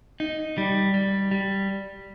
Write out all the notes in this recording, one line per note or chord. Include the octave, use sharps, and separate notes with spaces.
D#4
G3
G3
G3